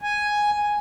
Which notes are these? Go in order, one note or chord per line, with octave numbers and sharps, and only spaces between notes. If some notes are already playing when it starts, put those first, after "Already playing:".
G#5